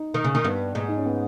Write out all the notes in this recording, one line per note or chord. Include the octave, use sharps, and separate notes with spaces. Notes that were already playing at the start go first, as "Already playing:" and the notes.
Already playing: D#4
D#3
C#3
D#3
G2 B3
G#2
D#4
C#4
B3